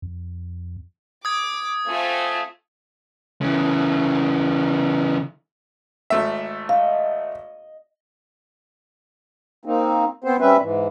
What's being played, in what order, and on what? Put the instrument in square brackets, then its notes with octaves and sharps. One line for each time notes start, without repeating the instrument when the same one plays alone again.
[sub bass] F2
[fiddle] D6 [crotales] D#6 G#6
[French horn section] A3 C4 [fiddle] F4 G#5
[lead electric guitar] C#3 E3
[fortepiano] G#1 A3 E5
[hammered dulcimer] D#5 [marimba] F5
[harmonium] A#3 C4 D#4
B3 C4 C5
G3 C4 C#4 B4 E5
G#2 E3